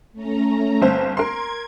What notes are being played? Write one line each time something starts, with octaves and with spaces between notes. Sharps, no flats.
A3 C#4 A#5
G1 C4 C5
A#4 C6 G#6